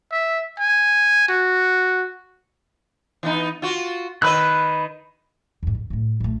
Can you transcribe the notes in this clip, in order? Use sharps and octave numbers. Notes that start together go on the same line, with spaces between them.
E5
G#5
F#4
E3 B3 D#4
F4 F#4
D#3 B4 D#5 B5 E6 F#6
E2 G#2
D3
A2 A3
A#1 A3